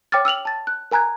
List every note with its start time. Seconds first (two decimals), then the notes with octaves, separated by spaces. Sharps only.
0.12 C#5 G5 D6 F6 A6
0.25 E6 F6 F7 F#7
0.45 A5 A6
0.67 F#6
0.91 A#4 G#5 A#5 F#6 G#6